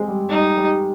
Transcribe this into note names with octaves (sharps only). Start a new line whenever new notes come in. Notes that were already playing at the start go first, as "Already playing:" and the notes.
Already playing: G#3 C4
G3
G3 D#4
G3